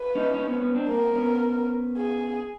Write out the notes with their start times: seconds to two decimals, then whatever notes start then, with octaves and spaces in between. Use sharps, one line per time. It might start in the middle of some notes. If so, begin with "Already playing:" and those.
Already playing: B4
0.15 C#4 D#4
0.34 C#4 D#4
0.47 B3 C#4
0.61 B3 C#4
0.75 C4 D4
0.88 A#3 C4 A#4
1.15 B3 C#4
1.97 G#4